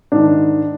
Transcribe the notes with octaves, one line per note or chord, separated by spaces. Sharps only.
G#2 D#3 D4